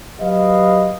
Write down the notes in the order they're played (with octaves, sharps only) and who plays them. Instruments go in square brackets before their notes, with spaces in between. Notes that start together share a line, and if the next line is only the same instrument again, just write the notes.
[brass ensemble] F#3 G4 B4 D#5 F5